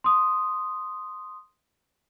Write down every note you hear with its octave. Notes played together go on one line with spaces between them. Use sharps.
C6 D#6